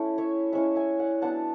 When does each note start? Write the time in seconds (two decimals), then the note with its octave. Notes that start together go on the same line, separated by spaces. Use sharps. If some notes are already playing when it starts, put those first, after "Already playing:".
Already playing: A3 C#4 E4
0.18 C#5 E5
0.52 G#3 C#4 E4 C#5 E5
0.75 E5 G#5
0.99 D5 F#5
1.22 F#3 B3 D4 F#5 A5